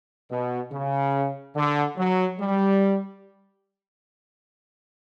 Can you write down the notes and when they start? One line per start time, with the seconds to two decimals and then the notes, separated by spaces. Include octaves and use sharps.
0.30 B2
0.71 C#3
1.55 D3
1.97 F#3
2.39 G3